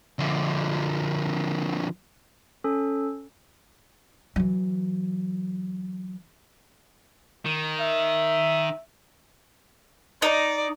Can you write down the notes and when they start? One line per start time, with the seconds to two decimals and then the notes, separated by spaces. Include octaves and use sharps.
0.19 D3 F3
2.64 C#4 A4
4.36 E3 F#3
7.46 D#3
7.80 E5
10.22 D#4 D5